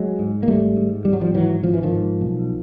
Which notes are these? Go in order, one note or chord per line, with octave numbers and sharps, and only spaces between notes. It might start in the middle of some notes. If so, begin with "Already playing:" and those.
Already playing: F#3 G#3
G#2
A#3
G#1 G3 A3
G#2
G#1 G3
F#3
F3 G3
G#2 E3 F#3
G#1 F3
E3
D#3 F3
G#2
B1